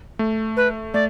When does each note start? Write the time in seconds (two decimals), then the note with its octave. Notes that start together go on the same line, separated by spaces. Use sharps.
0.19 A3
0.57 B4
0.94 A3 D5